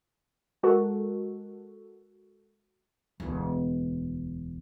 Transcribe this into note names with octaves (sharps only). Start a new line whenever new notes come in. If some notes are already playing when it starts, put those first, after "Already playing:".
G#3 F#4 A4 A#4
E1 D2